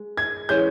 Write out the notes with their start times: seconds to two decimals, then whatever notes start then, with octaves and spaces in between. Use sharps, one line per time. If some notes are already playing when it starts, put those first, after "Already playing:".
Already playing: G#3
0.17 G#6
0.49 E3 G#3 C#4 G6